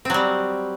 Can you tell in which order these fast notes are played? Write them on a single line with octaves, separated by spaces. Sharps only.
C4 F#3 G3